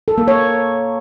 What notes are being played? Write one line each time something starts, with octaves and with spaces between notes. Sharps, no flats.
A4
A#3
C#5